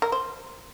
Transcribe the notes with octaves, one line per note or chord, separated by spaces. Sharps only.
A#4
C5